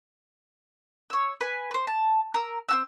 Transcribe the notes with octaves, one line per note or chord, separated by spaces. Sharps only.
C#5 E6
B4 G#5
B4 C5
A5
A#4 E6
C4 F#4 E6